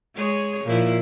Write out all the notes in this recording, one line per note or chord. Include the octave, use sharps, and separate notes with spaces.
G#3 G#4 C#5
A#2 F3 E4